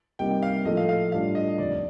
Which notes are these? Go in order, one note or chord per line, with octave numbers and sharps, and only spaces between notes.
C3 G3 A#3 D#4 G5
F5
A#1 A2 F3 A3 D#5
F5
F5
A2 G3 D4 F4 F5
D#5
F1 D#2 D#3 D5